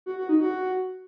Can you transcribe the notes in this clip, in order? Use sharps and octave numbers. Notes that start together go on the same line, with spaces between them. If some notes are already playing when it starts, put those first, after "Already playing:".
F#4
F#4
D#4
F#4